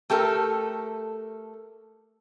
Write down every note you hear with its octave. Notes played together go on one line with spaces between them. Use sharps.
A3 G4 A4 A#4